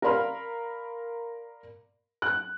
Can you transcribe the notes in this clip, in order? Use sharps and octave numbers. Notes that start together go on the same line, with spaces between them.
A#4 D5 F5 B5 C6 F6
F#6